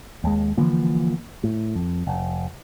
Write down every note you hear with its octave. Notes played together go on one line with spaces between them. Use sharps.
D#2 G#3
D3 E3 F3 A#3
A2
F2
F1